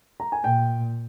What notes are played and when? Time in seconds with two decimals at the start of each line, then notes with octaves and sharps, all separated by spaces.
0.20 A#5
0.32 G#5
0.44 A#2 G5